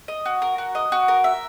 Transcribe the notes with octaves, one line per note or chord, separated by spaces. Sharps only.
D#5
F#4
A#4
F#4
D#5
F#4
A#4
E5